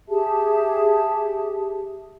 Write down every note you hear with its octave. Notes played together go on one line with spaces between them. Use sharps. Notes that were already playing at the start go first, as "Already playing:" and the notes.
G4 G#4 E5 A5